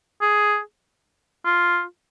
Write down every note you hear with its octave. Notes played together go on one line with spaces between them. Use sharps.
G#4
F4